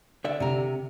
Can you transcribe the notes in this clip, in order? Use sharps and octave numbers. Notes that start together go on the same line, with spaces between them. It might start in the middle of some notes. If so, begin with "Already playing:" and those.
D3 D5 E5
C3 A#4